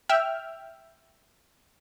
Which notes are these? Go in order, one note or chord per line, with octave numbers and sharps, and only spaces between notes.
E5 G5 F6